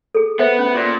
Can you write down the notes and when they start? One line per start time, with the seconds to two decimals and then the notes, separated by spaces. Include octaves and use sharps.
0.15 G#4 A4
0.39 B3 C5 E5
0.59 C#4
0.75 A#2